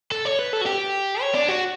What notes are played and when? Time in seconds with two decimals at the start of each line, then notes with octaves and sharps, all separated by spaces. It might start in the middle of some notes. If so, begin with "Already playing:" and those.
0.12 A4
0.25 C#5
0.39 B4
0.53 A4
0.61 F#4
0.66 G4
1.21 C#5
1.34 D4
1.48 F#4